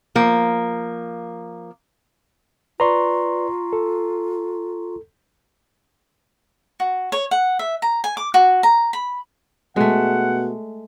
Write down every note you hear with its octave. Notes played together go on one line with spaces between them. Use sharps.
F3 A#3
F4 B4 D5 A#5 C6 C#6
A4
F#4
C#5
F#5
E5
A#5
G#5
D6
F#4
A#5
B5
B2 G#3 A3 F#5